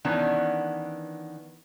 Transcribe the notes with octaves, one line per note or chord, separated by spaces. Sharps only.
D#3 E3 B3 C#4 D4